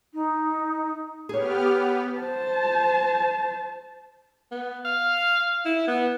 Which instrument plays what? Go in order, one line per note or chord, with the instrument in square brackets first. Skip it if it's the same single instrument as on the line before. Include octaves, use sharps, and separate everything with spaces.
[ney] D#4
[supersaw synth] B3 G4 F6 [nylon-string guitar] G#4 C#5
[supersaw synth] B3
[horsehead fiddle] C5 A5
[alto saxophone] B3
F5
E4
B3